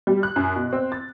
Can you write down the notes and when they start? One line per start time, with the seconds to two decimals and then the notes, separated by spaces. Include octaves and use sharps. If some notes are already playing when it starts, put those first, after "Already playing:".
0.07 G3
0.23 F#6
0.36 F#2
0.56 B2
0.73 C4
0.92 A6